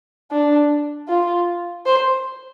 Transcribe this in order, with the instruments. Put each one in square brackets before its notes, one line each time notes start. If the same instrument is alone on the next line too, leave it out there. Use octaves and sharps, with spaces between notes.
[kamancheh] D4
F4
C5